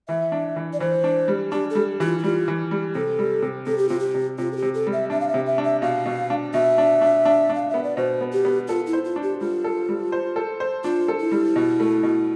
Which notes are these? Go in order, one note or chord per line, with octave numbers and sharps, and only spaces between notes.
E3 E5
D4
E3
D5
E3 C5
D4
G3
D4 G4
A4
G3
E3 G4
F4
E4
G3 F4
E3
G3
C3 A4
G3
C3
C3 A4
G4
C3 F4
G4
C3
C3 F4
A4
G4
C3
A4
G3
E5
D4 E5
F5
E5
C3
E5
D4
E5
B2 F5
B2
D4
B2 E5
D4
D4
D4
D4
F5
B3 E5
D5
B2 C5
B3
G4
B3
F4 A4
E4
C5
F4
D4
G4
G3 F4
A4
G3
C5
A4
C5
D4 F4
A4
E4
G3
B2
A3
B2